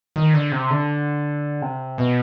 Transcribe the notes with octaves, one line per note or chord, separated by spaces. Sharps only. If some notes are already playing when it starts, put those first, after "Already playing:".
D#3
D3
C3
D3
C3
B2